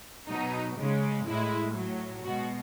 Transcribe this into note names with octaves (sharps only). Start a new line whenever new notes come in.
B2 F#3 D#4
C#3 G#3
A2 G#3 E4
A2 F#3
B2 G#3 F#4